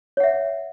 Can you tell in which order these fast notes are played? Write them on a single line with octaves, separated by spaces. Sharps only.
C#5 F#5 E5